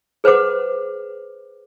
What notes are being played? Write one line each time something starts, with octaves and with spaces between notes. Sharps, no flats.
G#4 B4 C5 F#5 D6